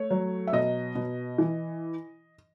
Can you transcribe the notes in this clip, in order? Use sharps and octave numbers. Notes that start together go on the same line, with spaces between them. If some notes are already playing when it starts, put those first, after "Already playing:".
Already playing: A3 C#5
F#3
E5
B2 D#5
B2
E3